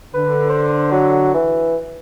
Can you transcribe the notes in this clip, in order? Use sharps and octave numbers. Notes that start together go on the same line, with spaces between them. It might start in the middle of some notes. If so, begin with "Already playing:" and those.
D3 B4
C5
F#3
E3